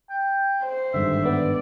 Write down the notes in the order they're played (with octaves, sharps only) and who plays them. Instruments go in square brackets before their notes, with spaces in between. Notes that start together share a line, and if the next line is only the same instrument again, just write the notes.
[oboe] G5
[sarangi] C5
[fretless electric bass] G#1 G2 D3 [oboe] E5
[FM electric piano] B3 [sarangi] D5